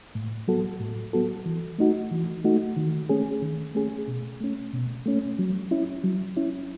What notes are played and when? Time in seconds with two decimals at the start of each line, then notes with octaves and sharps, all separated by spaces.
0.15 A2
0.48 F#3 B3 F#4 A4
0.80 A2
1.13 F#3 B3 F#4 A4
1.46 E3
1.79 A3 D#4 F#4
2.11 E3
2.44 A3 D#4 F#4
2.77 D#3
3.09 A3 C#4 G#4
3.42 D#3
3.75 A3 C#4 G#4
4.08 B2
4.41 A3 C#4
4.73 B2
5.06 A3 C#4
5.39 F#3
5.71 C#4 E4
6.04 F#3
6.37 C#4 E4